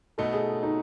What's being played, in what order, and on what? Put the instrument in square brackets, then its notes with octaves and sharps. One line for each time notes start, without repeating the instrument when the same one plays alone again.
[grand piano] B2 A3 D#4 [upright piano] A4
[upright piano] G#4
D#4